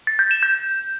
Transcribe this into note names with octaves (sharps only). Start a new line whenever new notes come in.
A6
G6
E7
G6